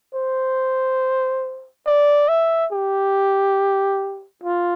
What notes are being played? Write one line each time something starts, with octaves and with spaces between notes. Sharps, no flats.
C5
D5
E5
G4
F4